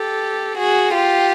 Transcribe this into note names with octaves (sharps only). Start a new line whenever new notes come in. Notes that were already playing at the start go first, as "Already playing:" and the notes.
Already playing: G4 A4
F#4 G#4
F4 G4